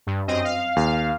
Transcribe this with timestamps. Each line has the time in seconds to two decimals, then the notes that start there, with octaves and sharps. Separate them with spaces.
0.07 G2
0.28 F#2 C4 D#5
0.44 F5
0.76 D#2 F5